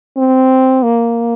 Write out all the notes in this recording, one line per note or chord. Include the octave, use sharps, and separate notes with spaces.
C4
A#3